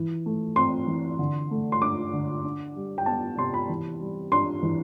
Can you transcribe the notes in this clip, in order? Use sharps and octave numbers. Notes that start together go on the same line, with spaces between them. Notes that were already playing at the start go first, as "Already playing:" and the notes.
Already playing: E3
A3
C4 C6
E3
D3
A3
C6
D4 D6
D3
D4
G3
G5
B3 A5
C3 C6
B5
E3
G3
D4 C6
E3